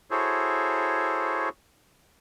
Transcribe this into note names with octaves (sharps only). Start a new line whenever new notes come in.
E4 F#4 G#4 A4 C5 C#5